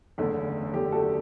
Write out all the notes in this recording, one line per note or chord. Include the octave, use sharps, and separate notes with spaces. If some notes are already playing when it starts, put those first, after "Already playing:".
F#1 E2 D3 A3
F#1 E2 D3 A3 G4
F#4 A4